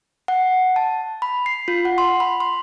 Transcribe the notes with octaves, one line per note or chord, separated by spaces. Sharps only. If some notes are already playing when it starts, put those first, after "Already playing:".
F#5
A5
B5
C7
F4
F#5
C6
B5
C6